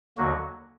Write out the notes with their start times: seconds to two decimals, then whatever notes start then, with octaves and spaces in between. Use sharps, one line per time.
0.18 D#2 D3 F#3 A#3 F#4